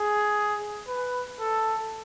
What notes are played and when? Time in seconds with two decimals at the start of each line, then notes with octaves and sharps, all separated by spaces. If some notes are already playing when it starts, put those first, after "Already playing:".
Already playing: G#4
0.88 B4
1.40 A4